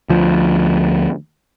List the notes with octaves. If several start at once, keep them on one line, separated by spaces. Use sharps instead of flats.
D2 F3